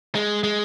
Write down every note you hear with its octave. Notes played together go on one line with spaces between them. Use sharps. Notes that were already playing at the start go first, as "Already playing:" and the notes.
G#3
G#3